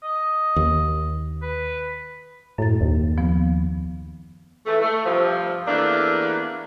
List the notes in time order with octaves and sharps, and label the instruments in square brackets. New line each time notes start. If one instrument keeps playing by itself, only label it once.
[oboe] D#5
[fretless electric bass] D#2
[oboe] B4
[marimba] F#2 A6 [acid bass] A2
[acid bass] D#2
[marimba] F3 B3
[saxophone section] E3 A3
A3
G2 C3 F3
E2 A3 A#3 D4